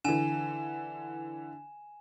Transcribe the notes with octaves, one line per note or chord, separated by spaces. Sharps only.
D3 E3 G#5 E7